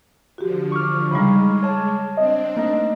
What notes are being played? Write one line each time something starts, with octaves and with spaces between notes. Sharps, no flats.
D3 F3 F#4 G4
C#6 D6 F6
C#3 G3 G#3 D#4 F5 B5
C#5 A5
C4 D4 D#5
A3 A#3 D#4 D#5